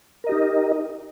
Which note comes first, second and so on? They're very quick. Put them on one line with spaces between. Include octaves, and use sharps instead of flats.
A#4 D#5 G4 D#4